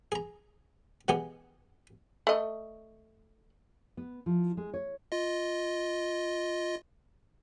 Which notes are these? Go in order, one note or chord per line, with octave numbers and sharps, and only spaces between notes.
G#4 A#5
B2 E3 B3 G4 G#4
A3 D#5
B3
F3
G#3
C#5
F4 D#5